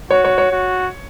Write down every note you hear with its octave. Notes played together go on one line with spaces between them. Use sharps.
F#4 C#5
C#5
C#5
F#4